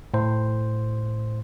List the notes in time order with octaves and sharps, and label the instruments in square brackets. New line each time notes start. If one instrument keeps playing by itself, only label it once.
[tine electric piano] A2 C5